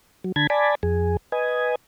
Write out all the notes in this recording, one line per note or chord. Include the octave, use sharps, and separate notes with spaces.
F#3
D3 A5 B5 G#6
D5 G#5 A5 B5
F2 G#4
B4 D#5 G#5